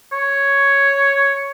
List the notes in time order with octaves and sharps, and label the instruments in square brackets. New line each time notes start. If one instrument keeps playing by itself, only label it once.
[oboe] C#5